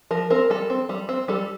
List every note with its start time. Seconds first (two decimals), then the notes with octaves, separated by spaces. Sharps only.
0.11 F3 A#4
0.30 C4 A#4
0.50 G3 A4
0.70 C4
0.89 G3
1.09 C4
1.28 G3 A4